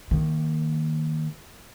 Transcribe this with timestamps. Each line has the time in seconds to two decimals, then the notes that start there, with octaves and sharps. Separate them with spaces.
0.11 D#3 A#3